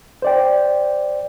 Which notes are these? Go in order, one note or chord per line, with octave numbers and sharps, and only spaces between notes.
C5 D5 G5